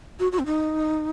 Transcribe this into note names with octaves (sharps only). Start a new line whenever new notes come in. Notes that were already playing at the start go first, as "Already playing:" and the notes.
F#4
F#4
C4
D#4